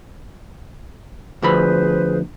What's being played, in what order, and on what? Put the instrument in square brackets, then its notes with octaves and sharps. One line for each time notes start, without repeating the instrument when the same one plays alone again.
[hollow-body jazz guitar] D2 F3 B5 [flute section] G#4 B4 C5